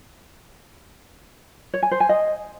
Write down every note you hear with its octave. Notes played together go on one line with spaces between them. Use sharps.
C#5
G#5
C5
G#5
D#5